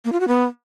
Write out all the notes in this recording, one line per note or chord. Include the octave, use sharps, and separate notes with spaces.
A#3
F4
F#4
B3